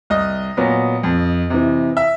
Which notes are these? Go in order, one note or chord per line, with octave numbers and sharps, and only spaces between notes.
C2 D#5
A#2 F#3 B3
F2
C3 E3
E5